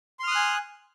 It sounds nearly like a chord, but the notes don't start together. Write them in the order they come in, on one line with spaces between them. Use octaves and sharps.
C6 F6 D#6 F#6 G#5